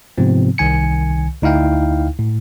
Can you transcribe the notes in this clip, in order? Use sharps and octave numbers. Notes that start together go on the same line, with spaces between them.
G#2 C3 F3 B3 C4
C2 D#3 G#5 C#7
D2 D#4 E4 F5 G5
A2